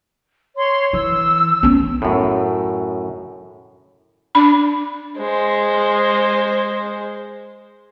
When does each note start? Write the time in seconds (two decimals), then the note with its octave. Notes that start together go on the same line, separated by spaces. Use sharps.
0.56 C#5 C6
0.93 E3 E6
1.63 B3 C#4
2.02 F#2 A2
4.35 D4 B5
5.18 G#3 C5